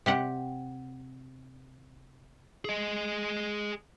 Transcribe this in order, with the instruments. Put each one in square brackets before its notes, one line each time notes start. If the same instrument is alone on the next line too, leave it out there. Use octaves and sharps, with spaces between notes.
[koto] C3 G4 F#5
[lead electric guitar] G#4 D#5